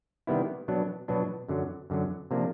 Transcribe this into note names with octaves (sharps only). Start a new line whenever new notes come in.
C3 D#3 G3 B3 E4
B2 F#3 B3 D4
B2 F#3 B3 D4
F#2 D3 F#3
F#2 D3 F#3
C3 F3 A#3 D4